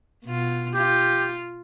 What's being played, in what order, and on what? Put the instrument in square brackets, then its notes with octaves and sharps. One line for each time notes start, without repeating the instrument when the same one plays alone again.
[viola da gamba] B2 F4
[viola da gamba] F4 [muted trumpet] G4